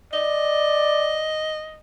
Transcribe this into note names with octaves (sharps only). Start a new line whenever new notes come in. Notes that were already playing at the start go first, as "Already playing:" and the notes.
D5 D#5